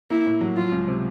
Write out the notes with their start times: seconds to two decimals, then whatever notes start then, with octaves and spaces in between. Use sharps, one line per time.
0.10 A#3 E4
0.26 A2
0.41 F#3
0.56 F3 F4
0.72 C#2
0.88 C3